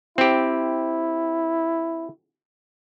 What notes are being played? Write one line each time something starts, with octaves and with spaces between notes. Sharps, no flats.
C4 E4 G4